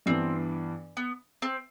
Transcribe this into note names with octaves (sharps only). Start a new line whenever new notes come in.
G2 E3 B3 C4 D4
B3
C4